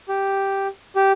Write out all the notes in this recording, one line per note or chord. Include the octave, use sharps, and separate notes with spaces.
G4
G4